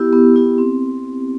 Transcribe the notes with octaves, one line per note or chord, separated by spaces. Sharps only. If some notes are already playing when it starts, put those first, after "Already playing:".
Already playing: B3 E4 G4
B3
E4 G4
C4